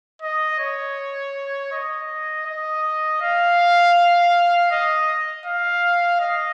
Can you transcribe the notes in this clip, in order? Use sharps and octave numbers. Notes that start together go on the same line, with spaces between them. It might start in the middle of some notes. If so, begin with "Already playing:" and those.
D#5
C#5
D#5
D#5
F5
D#5
F5
D#5